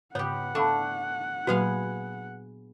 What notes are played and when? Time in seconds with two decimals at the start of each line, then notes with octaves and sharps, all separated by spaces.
0.15 G#2 C#3 B3 G4 C#5 F#5
0.55 A3 D4 A4 F5 B5
1.47 A#2 F#3 A#3 B3 F#4 G#4 B4 F5